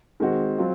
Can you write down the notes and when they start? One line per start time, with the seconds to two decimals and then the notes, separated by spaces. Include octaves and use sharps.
0.20 D#3 G#3 C4 F#4
0.58 F#3 C4 F4